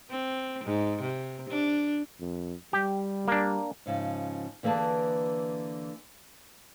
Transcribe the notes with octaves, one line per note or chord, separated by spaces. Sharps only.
C4
G#2
C3
D4
F2
G3 G4
A#3 D4
G#2 C#3 F3
D3 E3 A#3 G#4 B4 A5